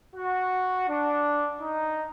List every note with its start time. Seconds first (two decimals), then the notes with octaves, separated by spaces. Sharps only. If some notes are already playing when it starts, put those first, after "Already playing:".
0.16 F#4
0.89 D4
1.61 D#4